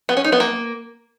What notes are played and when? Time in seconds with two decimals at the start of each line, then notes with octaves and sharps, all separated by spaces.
0.09 B3
0.17 C#4
0.24 D#4
0.32 B3
0.40 A#3